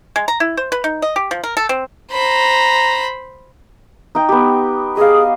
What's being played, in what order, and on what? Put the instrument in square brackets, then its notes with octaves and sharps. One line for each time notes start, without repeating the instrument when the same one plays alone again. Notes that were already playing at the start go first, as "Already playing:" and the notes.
[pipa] G#3
A#5
E4
C5
B4
D#4
D#5
G4
F3
A#4
A4
C4
[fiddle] C5 B5 [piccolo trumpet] A#5
[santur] D#4 G5
B3 G4
[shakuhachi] G#4 [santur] D#5 F5